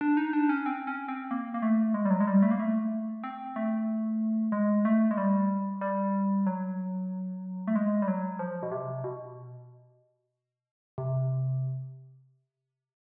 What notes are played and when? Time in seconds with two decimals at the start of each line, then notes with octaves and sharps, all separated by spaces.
0.01 D4
0.17 D#4
0.33 D4
0.49 C#4
0.66 C4
0.87 C#4
1.08 C4
1.31 A#3
1.54 A#3
1.62 A3
1.94 G#3
2.05 G3
2.10 F#3
2.21 G#3
2.27 G3
2.43 A3
2.51 A#3
2.60 A3
3.24 C4
3.56 A3
4.52 G#3
4.85 A3
5.11 G#3
5.17 G3
5.81 G3
6.47 F#3
7.67 A3
7.75 G#3
8.02 G3
8.08 F#3
8.39 F3
8.63 B2
8.72 C3
9.04 B2
10.98 C3